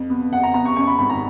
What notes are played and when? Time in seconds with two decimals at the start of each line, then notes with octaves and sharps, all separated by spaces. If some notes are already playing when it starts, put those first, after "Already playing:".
Already playing: F2
0.10 B3
0.32 F2 F#5
0.43 A#5
0.54 B3 A#5
0.65 C#6
0.76 F#2 C#6
0.87 B5
0.99 G#1 B5
1.10 A#5